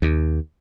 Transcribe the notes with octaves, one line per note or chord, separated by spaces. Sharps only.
D#2